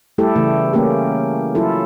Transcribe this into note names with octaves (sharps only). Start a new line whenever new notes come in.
G3 A3 E4 G4 A4
C#3 E3 A3
A3 A#3 C#4 G4
F#3 E4 F4 A4